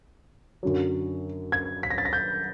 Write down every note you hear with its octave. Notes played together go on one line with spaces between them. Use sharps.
F#2 D3 F#3
G#6
B6
A#6
A6
A#6
G6